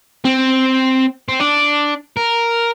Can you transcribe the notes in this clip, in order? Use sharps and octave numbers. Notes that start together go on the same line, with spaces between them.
C4
C4
D4
A#4